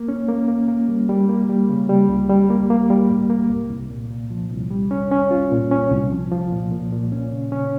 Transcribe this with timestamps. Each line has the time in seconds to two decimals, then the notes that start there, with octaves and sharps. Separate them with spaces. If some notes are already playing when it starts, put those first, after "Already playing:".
Already playing: A#3
0.08 C#4
0.28 A#3
0.48 A#3
0.68 A#3
0.89 G3
1.09 G3
1.29 A#3
1.49 G3
1.69 C#3
1.89 G3
2.09 C#2
2.30 G3
2.50 A#3
2.70 A#3
2.90 G3
3.10 G#2
3.30 A#3
3.50 C2
3.70 C2
3.91 A#2
4.10 A#2
4.30 F3
4.51 C2
4.71 G3
4.91 C#4
5.11 C#4
5.31 F4
5.51 A#2
5.71 C#4
5.91 C2
6.12 F3
6.31 F3
6.52 A#2
6.72 A#2
6.92 A#2
7.12 C#4
7.32 C#3
7.52 C#4